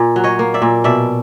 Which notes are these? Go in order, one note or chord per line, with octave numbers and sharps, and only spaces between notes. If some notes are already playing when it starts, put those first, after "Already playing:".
Already playing: A#2
F#3
C#5 D#5
A#3
D5 E5
A#2
B2 D5 E5